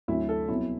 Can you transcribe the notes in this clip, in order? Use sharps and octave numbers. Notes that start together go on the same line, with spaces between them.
D2 C3 F#3 E4
A4
C2 B2 F#3 E4